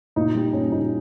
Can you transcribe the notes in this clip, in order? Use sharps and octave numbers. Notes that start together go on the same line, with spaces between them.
A#2 D#4
G3
A#2 C#4
A#2 D#4